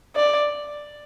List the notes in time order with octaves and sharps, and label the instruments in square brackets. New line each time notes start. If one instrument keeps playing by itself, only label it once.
[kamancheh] D5